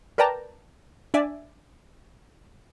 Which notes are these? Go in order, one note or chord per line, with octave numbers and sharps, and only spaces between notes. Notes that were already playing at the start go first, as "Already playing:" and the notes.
A#4 B4 D5 G5 A5 A#5
D4 D5 E5 G#5